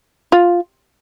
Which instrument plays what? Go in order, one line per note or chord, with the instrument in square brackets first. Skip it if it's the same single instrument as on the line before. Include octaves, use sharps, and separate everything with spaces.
[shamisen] F4